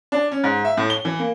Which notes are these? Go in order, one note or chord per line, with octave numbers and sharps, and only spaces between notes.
D4
C#4
G#2
E5
A2
G7
E3
A#3